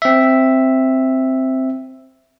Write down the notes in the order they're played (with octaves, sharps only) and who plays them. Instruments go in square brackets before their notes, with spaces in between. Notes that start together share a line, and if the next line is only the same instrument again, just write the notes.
[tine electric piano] C4 E5